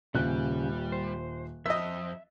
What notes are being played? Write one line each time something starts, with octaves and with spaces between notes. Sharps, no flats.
D#1 C#3 G3 F#6
C5
F2 D#5 E5 E6